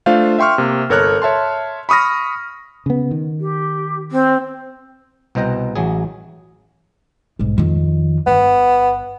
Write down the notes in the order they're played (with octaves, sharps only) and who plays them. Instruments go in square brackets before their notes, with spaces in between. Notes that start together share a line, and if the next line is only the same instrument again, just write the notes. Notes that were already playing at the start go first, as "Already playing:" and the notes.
[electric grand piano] A3 D4 F4 C5 F5
E5 G5 C6 C#6 F6
C3 A#3
G1 A4 A#4 C#5 F6 F#6
C#5 E5 A5 C6
B5 C#6 D#6 F6 A#6
[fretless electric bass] C#3 B3
D#3
[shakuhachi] G4
C4
[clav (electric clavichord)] C2 B2 C5 D#5 G5 A#5
A1 F#3 G#4
[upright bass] B1 G#2
F2 D#3
[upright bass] G1 [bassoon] B3